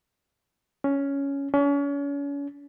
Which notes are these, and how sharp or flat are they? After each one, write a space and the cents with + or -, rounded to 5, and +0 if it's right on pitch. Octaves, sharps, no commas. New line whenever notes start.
C#4 +5
C#4 +35